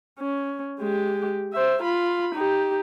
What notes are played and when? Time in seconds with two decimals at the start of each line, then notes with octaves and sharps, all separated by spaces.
0.19 C#4
0.80 G#3 G4
1.52 C5 E5
1.82 F4 B5
2.35 D#4 G4